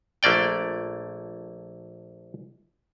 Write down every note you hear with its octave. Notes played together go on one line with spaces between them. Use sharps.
A#1 A3 A#3 D5 G5